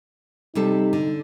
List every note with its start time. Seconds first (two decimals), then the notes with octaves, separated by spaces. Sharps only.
0.55 C3 G3 D#4 A4
0.93 D3